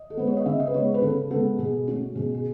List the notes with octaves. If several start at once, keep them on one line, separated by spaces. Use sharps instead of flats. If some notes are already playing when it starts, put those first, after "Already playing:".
Already playing: D#5
A4
G#3 B3 B4
C#5
D#5
C#3 E5
D#5
B4
G#3 B3 C#5
B4
C#3 A4
G#3 B3 A4
B2 G#4
A3 C#4 F#4
B2 G#4
G#4